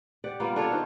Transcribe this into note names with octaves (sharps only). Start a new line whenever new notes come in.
G4 D5 F#5
G3 A#3 B3 F4
D4 F4 A4 C#5
D#3 F#4 C5